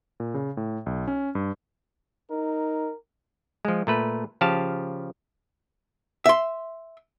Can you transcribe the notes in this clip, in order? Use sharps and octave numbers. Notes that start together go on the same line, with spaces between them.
A#2
C#3
A2
B1
C#4
G2
D#4 A#4
F3 G#3
A#2 A3 B4
C#3 F3 G4 F5 A5
E5 C6